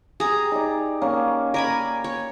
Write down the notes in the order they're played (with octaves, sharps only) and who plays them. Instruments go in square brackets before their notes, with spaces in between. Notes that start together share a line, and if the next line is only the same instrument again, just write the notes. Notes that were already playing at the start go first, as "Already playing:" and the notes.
[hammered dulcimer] G4 [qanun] G#4 A#5
[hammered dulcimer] D#4 D5
A#3 C#4 F5
[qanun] A#4 G#5 B5 [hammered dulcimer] D5
[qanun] C#5